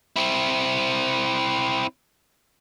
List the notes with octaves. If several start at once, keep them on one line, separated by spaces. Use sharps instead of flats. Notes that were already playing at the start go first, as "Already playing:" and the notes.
C4 E4